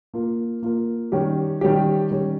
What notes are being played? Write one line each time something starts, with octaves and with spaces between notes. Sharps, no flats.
A#3 F4 A#4
A#3 F4 A#4
D#3 G3 C#4 G4
D#3 G3 C#4 G4
D#3 G3 C#4 G4